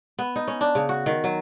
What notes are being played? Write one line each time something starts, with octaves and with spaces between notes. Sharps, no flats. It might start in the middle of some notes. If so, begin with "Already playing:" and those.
B3
D#4
C#4
D4
C#3
F#4
D#3
F#3